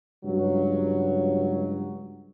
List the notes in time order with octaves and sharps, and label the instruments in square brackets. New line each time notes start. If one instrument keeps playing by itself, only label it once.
[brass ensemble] C#2 G2 F#3